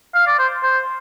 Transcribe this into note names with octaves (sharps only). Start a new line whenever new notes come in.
F5
D5
C5
C5